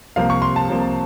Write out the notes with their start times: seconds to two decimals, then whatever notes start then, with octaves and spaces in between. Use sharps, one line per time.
0.16 C2 C3 F3 A#3 F5
0.30 C#6
0.42 C6
0.56 A5
0.69 C2 C3 F3 A#3